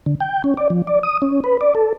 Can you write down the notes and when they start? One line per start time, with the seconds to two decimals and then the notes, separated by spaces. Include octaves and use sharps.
0.06 D3
0.20 G5
0.44 C#4
0.57 D5
0.70 F3
0.87 D5
1.03 D#6
1.22 C#4
1.44 B4
1.61 D5
1.75 A4